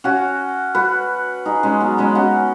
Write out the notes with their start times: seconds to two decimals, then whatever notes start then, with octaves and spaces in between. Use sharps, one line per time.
0.04 C#4 F#4
0.75 F#4 B4
1.45 D#4 G#4
1.63 G#3 C#4
1.81 F#3 B3
1.98 G#3 C#4
2.15 C#4 F#4